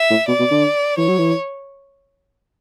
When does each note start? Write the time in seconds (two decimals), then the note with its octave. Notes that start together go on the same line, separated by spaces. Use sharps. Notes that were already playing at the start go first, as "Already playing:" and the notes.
Already playing: E5
0.10 A2
0.28 B2 D5
0.39 B2
0.51 D3
0.98 E3 C#5
1.08 F#3
1.18 E3